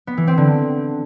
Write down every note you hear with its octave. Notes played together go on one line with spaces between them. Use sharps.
B3
E3
C4
D3